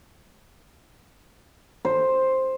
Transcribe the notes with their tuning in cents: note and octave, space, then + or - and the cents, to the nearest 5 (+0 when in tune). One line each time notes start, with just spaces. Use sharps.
C5 +5